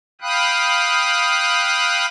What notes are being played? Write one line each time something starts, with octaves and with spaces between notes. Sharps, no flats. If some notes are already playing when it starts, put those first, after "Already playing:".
F5 G5 B5 D#6 F#6